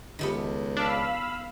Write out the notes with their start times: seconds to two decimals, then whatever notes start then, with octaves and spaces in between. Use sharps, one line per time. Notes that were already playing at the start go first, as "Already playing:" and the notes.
0.19 C#2 D#3 A3 B3
0.77 D4 F5 B5 E6